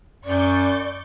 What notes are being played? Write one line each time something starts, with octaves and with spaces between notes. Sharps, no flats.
F#2 D5 C#6 D6 G6